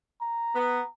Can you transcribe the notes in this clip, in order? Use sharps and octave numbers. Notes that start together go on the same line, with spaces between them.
A#5
B3